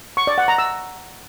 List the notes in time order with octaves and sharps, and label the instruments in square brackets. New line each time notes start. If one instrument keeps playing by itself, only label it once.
[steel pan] C#6
D5
F#5
A#5
E6